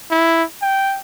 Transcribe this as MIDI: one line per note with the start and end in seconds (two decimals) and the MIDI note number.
0.11 0.43 64
0.62 1.00 79